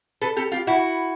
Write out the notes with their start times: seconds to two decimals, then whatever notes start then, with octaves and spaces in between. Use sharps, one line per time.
0.21 A4 B4
0.36 G4 A4
0.52 F4 G4
0.67 E4 F#4